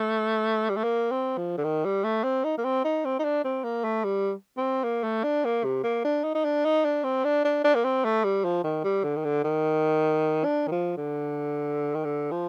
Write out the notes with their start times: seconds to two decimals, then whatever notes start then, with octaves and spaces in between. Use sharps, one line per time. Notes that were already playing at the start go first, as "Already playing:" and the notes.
Already playing: A3
0.70 G3
0.76 A3
0.84 A#3
1.11 C4
1.38 F3
1.58 D3
1.64 D#3
1.85 G3
2.04 A3
2.24 C4
2.44 D#4
2.58 A#3
2.65 C4
2.84 D#4
3.05 C4
3.19 D#4
3.24 D4
3.44 C4
3.64 A#3
3.84 A3
4.04 G3
4.57 C4
4.84 A#3
5.04 A3
5.24 D4
5.45 A#3
5.64 C3
5.84 A#3
6.05 D4
6.24 D#4
6.35 D#4
6.45 D4
6.65 D#4
6.85 D4
7.04 C4
7.24 D4
7.44 D4
7.64 D4
7.75 A#3
7.84 C4
8.05 A3
8.24 G3
8.44 F3
8.64 D#3
8.84 G3
9.04 D3
9.16 D#3
9.25 D3
9.44 D#3
10.44 D4
10.67 D#3
10.71 F3
10.97 D3
11.95 D#3
12.04 D3
12.31 F3